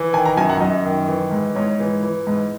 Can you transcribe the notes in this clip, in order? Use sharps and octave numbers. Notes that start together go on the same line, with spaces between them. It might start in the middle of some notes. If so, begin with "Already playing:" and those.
Already playing: E3
D#3 G#5
A#5
F#2 G#5
F#5
F#2 D#5
D#3
E3
G#2
G#2 C#5
E3
E3
G#2